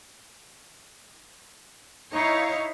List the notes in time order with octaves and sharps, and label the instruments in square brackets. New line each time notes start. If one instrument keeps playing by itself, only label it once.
[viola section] D#4 [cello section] E4 C#5 F5